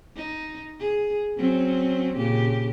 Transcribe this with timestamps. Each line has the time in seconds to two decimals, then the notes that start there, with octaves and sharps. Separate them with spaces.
0.16 D#4
0.79 G#4
1.37 F#3 C4 C#4
2.16 A#2 C#3 G4